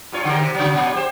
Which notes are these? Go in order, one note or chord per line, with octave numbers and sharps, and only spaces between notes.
G2 F4 C#5
D3 G4 A#4
C3
C#3 F#3
A#2 F#3
G4 C5